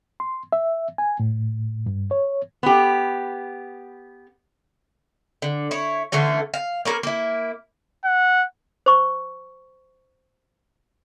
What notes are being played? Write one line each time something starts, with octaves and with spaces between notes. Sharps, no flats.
C6
E5
G#5
A2
G2
C#5
B3 G4
D3
E4 C#5
D3 E3 A3 C#4
F5
A#3 C#4 A#4 B4
A#3 E4
F#5
C5 C#6